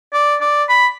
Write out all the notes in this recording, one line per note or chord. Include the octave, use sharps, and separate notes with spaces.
D5
D5
B5